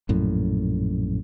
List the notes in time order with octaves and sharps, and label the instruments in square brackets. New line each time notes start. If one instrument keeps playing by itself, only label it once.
[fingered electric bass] A#1 F#2 A2